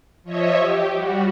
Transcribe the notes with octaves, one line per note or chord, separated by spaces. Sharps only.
F3 C#5 D#5 E5
G4
G3 F#4